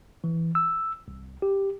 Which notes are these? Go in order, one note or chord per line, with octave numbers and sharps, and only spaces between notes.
E3
E6
C2
G4